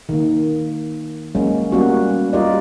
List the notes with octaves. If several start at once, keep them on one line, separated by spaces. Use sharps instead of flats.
D#3 A#3
F#3 G#3 A#3 C#4
G3 A#3 B3 C#4 F#4
G3 F4 G4 A#4 D5 D#5